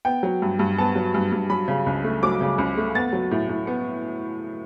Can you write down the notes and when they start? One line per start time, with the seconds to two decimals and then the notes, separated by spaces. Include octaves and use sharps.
0.05 B3 G5
0.23 F#3
0.42 G2
0.59 G2
0.78 B3 A5
0.96 F#3
1.14 G2
1.32 G2
1.50 F#3 B5
1.68 C#3
1.86 C#2
2.04 A3
2.23 F#3 D6
2.41 C#3
2.58 C#2
2.78 A3
2.95 B3 A6
3.13 F#3
3.31 A2
3.49 A2
3.67 B3